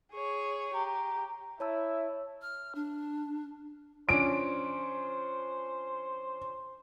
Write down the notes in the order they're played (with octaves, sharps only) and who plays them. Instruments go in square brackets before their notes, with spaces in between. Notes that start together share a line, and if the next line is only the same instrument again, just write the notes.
[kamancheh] G#4 C#5
[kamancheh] G4 [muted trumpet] A#5
[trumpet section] E4 E5 [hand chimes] C#5 A5 E6
[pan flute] F6
D4
[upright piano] F3 C#4 D4 [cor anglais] C5 [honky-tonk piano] D7